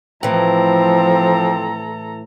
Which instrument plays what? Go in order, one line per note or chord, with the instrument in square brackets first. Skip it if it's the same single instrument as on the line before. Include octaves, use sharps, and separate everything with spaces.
[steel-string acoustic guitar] A2 E3 [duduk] F3 [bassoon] C4 [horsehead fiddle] A4 A#5